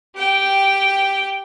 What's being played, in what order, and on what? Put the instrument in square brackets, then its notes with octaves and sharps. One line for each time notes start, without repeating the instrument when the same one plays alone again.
[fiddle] G4 G5